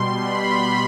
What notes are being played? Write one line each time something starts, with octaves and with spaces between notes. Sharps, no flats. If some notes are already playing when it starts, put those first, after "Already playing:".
Already playing: B2 G3 C6
B5